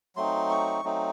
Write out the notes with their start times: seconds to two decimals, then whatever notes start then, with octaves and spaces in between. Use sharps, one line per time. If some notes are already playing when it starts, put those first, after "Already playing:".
0.16 F#3 A3 C4 D#4 C6
0.50 C#6
0.84 F#3 A3 C4 D#4